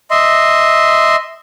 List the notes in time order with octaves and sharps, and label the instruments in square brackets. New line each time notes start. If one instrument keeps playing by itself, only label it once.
[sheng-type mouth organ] D#5 E5 C6